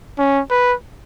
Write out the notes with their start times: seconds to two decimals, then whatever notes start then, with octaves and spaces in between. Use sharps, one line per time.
0.18 C#4
0.51 B4